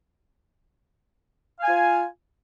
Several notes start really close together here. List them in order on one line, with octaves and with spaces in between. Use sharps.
F5 G#5 F4